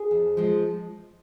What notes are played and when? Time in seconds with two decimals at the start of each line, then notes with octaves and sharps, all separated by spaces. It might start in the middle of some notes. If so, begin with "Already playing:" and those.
Already playing: G#4
0.11 F2
0.37 F3 G#3